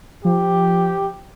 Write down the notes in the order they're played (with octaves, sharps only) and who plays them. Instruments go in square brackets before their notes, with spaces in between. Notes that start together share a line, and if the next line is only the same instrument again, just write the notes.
[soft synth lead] F3 [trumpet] G4